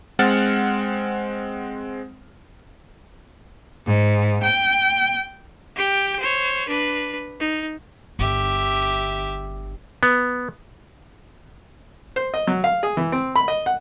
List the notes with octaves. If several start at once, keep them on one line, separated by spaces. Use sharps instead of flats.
G#3 C4 F#5 F6 A6
G#2
G5
G4 G5
C5 C#5
D4 B4
D#4
G1 D3 G4 E5
B3
C5
D#5
F#3
F5
G#4
E3
C4
B5
D#5
F#5